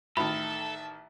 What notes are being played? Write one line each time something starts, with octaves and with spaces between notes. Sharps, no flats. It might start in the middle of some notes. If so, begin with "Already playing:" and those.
A1 D#3 A4 E5 A5 B5